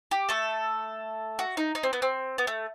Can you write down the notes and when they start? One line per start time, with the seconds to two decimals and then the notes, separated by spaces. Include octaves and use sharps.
0.11 G4
0.29 A3 A4
1.39 F#4
1.57 D#4
1.75 D#4
1.83 C4
1.93 B3
2.02 C4
2.38 B3
2.47 A3